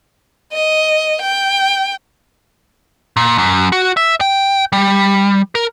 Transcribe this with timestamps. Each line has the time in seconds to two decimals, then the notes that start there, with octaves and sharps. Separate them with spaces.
0.53 D#5
1.22 G5
3.17 A#2
3.38 F#2
3.72 F#4
3.97 E5
4.21 G5
4.73 G3
5.55 A#4